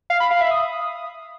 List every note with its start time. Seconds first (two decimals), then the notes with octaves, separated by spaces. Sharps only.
0.10 F5
0.20 B5
0.30 F5
0.41 E5
0.51 D#6